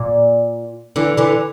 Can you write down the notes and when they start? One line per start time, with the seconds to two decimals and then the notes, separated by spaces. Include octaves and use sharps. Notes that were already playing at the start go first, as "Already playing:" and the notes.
Already playing: A#2
0.96 D3 E3
1.17 D3 E3